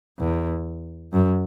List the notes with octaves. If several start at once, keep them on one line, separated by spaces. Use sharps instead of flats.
E2
F#2